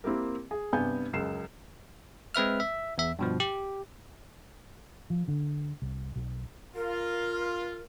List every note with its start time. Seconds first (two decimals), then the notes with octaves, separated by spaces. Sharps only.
0.04 A#3 C4 E4 G4 A#4
0.51 G#4
0.73 G2 C3 B3 G#5 G6
1.13 C#2 F#2 C7 E7
2.35 G#3 C4 B4 E5 F6
2.60 E5
2.98 E2 E5
3.19 G2 B2 F3
3.40 G4
5.10 F3
5.28 D3
5.82 C2
6.16 B1
6.76 F4 A#4